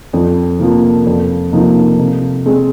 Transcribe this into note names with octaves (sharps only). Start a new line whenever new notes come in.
F2
C3 F3 A#3
F2
C3 F3 A#3 D#4
C3
G#3 C4